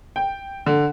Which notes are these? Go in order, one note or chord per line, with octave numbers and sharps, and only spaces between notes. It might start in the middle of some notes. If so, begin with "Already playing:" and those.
G5
D3